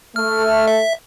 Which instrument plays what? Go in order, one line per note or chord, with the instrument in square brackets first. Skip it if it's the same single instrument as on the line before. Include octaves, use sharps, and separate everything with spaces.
[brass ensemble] A3 [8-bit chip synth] F6
[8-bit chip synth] E5